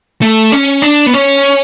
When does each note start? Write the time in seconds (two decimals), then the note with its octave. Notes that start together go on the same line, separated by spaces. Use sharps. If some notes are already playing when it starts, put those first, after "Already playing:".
0.22 A3
0.52 C#4
0.82 D4
1.06 B3
1.14 C#4